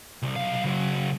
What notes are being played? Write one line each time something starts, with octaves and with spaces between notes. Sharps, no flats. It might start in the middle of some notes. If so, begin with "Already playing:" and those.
C2
B1 F5
C#3 F#3